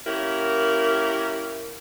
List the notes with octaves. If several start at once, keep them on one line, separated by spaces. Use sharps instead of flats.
A#3 C#4 E4 G4 A#4